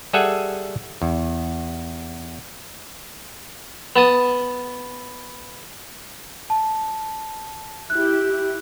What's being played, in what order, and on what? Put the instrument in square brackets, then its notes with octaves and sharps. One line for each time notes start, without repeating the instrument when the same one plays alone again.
[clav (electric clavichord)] G3 G#4 A4 E5 F#5 G#5
E2
[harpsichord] B3 A5 D#6
[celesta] A5
[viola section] E4 G4 [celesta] F#6